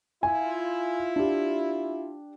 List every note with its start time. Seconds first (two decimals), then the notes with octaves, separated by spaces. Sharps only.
0.23 E4 F4 G#5
1.16 D4 G4